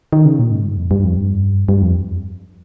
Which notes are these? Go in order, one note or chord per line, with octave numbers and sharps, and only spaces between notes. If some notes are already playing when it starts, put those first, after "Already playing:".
D#3
C#3
A#2
G#2
G2
F2
G2
F2
G2
G2
F2